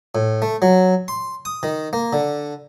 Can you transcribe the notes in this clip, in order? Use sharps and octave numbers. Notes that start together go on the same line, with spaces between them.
A2
A3
F#3
C6
D#6
D#3
A#3
D3